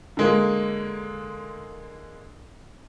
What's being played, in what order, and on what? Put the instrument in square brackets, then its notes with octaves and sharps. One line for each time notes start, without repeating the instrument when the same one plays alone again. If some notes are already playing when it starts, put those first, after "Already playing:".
[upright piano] D3 G#3 A#3